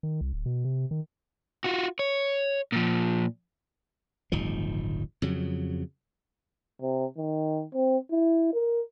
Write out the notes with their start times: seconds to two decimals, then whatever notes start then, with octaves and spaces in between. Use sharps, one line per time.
0.03 D#3
0.21 C2
0.33 D1
0.46 B2
0.64 C3
0.91 D#3
1.64 F4 F#4
1.99 C#5
2.72 A#2 F3
4.32 D1 G1 D#3 F3
5.22 F2 C#3 F#3
6.81 C3
7.17 D#3
7.74 C4
8.11 E4
8.54 A#4